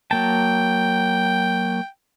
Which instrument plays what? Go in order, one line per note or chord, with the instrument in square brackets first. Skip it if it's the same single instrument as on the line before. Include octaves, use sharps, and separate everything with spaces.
[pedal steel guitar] F#3 A#3 A5 [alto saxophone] G5